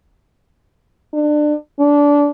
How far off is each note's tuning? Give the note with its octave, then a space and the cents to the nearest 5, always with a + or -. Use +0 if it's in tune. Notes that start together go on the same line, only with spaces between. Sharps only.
D4 +25
D4 -20